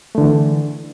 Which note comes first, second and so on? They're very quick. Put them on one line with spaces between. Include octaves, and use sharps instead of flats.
A3 D3 E3